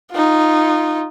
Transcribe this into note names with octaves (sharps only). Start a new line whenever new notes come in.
D#4 F4